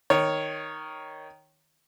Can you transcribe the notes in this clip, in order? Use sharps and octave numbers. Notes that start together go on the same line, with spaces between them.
D#3 C#5